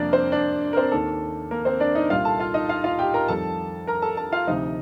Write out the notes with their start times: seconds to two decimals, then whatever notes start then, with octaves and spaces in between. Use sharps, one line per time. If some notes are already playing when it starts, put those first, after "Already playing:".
Already playing: F2 C3 G3 A#3 D4 A#4 D5
0.13 C4 C5
0.32 D4 D5
0.73 A#4
0.77 C4 C5
0.92 D#2 D#3 A#3 A4
1.51 A#3 A#4
1.65 C4 C5
1.80 D4 D5
1.95 D#4 D#5
2.10 C2 A#2 G3 A#3 F4 F5
2.25 A4 A5
2.40 F4 F5
2.54 D#4 D#5
2.69 F4 F5
2.84 F4 F5
2.99 G4 G5
3.14 A#4 A#5
3.28 F2 D#3 G3 A4 A5
3.87 A#4 A#5
4.02 A4 A5
4.17 A4 A5
4.32 F4 F5
4.47 D2 C3 F3 D#4 D#5